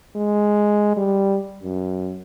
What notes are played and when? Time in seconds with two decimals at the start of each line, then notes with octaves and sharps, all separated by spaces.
0.15 G#3
0.97 G3
1.62 F#2